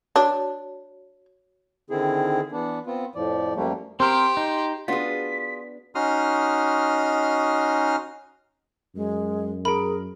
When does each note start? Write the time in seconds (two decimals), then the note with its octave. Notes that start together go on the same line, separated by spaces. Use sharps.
0.16 D4 F#4 C#5
1.90 D3 D#3 C4 E4 G#4
2.52 E3 B3 D4
2.87 B3 C4 F4
3.15 F2 A2 F3 D5
3.56 F#2 F3 G3 A3 A#3
4.00 C4 G4 A#4 C5
4.37 D#4
4.88 B3 D4 F4 F#4 G#4 B6
5.95 C#4 D#4 F#4 C6 D#6 F6
8.96 F#2 G#3
9.65 G#4 A#4 B5 D7